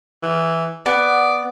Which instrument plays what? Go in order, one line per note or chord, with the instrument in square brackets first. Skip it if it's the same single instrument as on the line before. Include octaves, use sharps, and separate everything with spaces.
[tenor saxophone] E3
[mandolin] B3 [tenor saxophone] D5